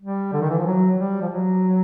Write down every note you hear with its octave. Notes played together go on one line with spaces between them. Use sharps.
G3
D3
D#3
E3
F3
F#3
G3
F3
F#3